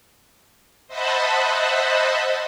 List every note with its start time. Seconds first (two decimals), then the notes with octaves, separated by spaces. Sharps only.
0.87 C5 D#5 E5 F#5 A5 B5